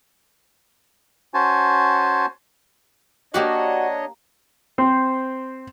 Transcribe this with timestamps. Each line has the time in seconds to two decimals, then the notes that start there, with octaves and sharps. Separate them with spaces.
1.34 C#4 F#4 C5 G#5 A5
3.34 A#3 D4 F#4 G4 C#5 D#5 F#5
4.78 C4 C5